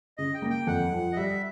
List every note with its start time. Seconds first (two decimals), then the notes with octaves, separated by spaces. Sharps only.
0.18 C#3 D#5
0.34 G5
0.42 A#3
0.50 G5
0.67 F2 F#5
0.92 F3
1.13 D#5
1.16 G3 E5